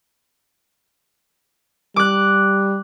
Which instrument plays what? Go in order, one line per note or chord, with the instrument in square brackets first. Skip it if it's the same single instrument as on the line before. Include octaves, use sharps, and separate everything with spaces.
[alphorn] G3 [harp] D6 F#6